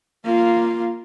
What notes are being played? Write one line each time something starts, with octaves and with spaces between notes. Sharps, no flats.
A#3 F4